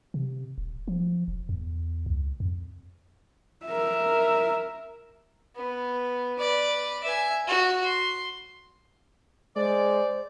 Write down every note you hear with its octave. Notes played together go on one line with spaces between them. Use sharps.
C3
D#1
F3
E1
E2
C#2
F2
A#4 E5
B3
B4 D5
E5 G#5
F#4
C6
G#3 C5 D5